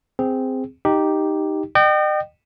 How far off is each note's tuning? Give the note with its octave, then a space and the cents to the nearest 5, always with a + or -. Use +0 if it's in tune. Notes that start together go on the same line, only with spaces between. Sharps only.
C4 -10 G#4 -10
D#4 +0 G4 +0
D#5 -40 G5 -25